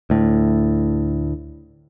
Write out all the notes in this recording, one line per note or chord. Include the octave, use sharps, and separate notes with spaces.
D2 A2